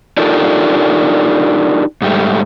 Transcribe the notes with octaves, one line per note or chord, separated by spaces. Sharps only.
D4 D#4 F4 G4 A4 A#4
G#2 G3 A3